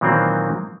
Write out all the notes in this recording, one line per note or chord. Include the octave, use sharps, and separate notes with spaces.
A#2 D#3 E3 F#3 A#3 C4